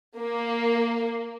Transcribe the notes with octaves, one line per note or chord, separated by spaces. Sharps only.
A#3